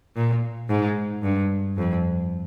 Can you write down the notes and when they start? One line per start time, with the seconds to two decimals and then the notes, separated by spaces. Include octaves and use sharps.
0.16 A#2
0.69 G#2
1.23 G2
1.77 F2